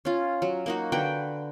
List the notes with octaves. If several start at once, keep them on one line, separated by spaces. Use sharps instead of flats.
C#4 F4
F#3
A#3 D#4 F#4
D3 F#4 B4 G5